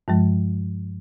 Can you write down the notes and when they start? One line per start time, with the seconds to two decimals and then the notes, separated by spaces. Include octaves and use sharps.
0.08 G2 F3 G#3